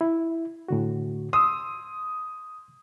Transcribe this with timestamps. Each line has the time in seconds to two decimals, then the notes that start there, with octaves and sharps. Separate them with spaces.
0.01 E4
0.68 A2 D3 F#4
1.33 C6 D#6 E6